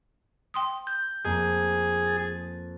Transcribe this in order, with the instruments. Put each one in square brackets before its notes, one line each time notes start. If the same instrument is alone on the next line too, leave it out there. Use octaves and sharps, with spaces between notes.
[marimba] G5 C6 D#6
[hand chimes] G6
[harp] F2 A#3 [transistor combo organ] G#4
[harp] A6